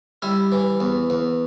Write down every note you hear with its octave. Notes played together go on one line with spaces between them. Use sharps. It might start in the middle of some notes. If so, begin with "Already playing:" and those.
G3 E4
E3
E2
E2